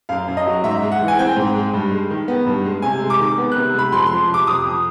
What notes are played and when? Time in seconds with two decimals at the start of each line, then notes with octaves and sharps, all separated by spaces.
0.09 F#2 F5
0.28 F#2
0.37 D#5
0.46 F#3
0.64 G#2 E5
0.82 G#3
0.92 F#5
1.01 E3
1.08 G#5
1.19 C4 G5
1.37 G#2
1.55 G#3
1.74 G2
1.92 G#3
2.10 D#3
2.28 B3
2.46 G2
2.65 G#3
2.82 C3 G#5
3.01 G#3
3.10 D6
3.19 D#3
3.38 B3
3.52 C3 F#6
3.74 G#3 B5
3.92 F2 C6
4.06 C6
4.11 F3
4.29 C3 D6
4.47 F2 D#6
4.65 F2